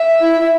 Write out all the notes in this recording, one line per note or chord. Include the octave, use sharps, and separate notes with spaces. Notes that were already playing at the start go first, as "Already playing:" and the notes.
Already playing: E5
E4
E4